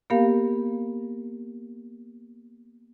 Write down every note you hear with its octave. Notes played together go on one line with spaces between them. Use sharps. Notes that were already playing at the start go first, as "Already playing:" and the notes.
A#3 B3 G4 A#4 F5